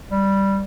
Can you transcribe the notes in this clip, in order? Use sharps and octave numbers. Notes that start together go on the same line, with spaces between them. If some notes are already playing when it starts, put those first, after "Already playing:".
G3